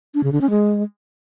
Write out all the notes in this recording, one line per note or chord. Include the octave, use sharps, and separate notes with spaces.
D4
C#3
D3
C#4
G#3